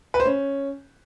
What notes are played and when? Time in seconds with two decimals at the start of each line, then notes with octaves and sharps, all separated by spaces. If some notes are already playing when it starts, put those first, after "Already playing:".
0.14 B4
0.20 C5
0.25 C#4